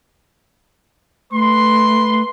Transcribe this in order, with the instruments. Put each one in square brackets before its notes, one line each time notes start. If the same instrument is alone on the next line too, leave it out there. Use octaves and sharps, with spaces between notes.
[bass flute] A3 [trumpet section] B4 C6